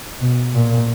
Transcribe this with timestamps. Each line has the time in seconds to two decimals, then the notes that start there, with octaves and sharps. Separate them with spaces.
0.21 B2
0.54 A#2